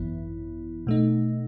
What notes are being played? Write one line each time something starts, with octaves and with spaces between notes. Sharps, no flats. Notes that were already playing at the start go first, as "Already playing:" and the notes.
Already playing: G#1 F#2 E3 B3 E4
B2 A3 D#4